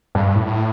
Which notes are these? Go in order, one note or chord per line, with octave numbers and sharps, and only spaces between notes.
G2
A2